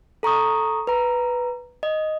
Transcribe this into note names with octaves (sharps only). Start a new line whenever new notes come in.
A4 A#5 C#6 D#6
B4 A#5
D#5